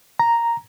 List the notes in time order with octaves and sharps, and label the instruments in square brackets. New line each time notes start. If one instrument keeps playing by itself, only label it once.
[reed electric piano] A#5